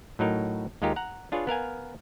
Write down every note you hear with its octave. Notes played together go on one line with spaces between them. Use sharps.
A2 F#3 D#4 A#4
D#2 G#3 D#4 F4 G4 A#4
F#5 A#5
D4 F4 G#4 B4 C#5
B3 A#4 F5 G#5